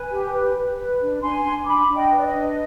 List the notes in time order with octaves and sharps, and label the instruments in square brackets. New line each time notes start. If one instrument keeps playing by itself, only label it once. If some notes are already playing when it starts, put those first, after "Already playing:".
Already playing: [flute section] B4 G#5
G4
B4
B4
B4
D4
D4 G#5 C6
D4
D4 B5 D6
D4
D#5 G5
B4
D5
D#5
D4